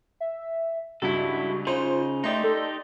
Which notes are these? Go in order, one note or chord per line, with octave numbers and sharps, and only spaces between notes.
E5
C#2 G2 E4 F#4 A4
C#3 D#4 F4 C5
A3 D#4 G4 D5 D#5 C6
A4